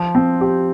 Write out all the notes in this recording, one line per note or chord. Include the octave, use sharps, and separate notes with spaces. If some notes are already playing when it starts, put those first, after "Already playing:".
Already playing: F3
C4
G4